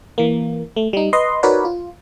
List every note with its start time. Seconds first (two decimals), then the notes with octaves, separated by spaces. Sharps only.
0.18 E3 A#3
0.76 A3
0.93 G3 D#4
1.13 B4 D#5 C6
1.43 D#4 F#4 A#4 B4 C#5 D5
1.65 F4